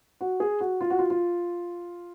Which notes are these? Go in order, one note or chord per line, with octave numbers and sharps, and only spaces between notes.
F#4
G#4
F#4
F4
F#4
F4
F4